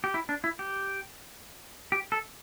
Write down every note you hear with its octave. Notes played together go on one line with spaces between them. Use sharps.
G4
E4
D4
E4
G4
G4
A4